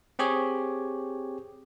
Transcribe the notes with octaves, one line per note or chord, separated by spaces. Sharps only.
C4 G4 G#4 C#5